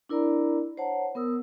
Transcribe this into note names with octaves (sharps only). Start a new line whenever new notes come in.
D4 E4 A#4 D5 A#5 B5
C5 C#5 F#5 A5 A#5
B3 A#4 D#6 E6